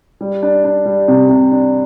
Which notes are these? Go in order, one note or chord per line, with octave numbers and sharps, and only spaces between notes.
G3
D4
D4
G3
C3
C3
D4